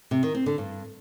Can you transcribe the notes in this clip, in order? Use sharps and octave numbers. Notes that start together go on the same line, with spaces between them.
C3
D#3
C4
D3
G2